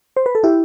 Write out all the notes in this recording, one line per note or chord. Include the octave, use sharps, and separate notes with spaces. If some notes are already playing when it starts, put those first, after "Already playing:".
C5
B4
A4
E4 G4